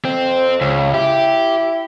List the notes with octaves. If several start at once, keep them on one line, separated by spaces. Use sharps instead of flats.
F2 C4
C#2 C#3
E4 G4